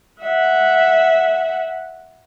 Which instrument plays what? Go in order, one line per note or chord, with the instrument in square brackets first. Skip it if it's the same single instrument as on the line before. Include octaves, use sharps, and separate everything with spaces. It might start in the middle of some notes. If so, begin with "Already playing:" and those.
[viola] E5 F#5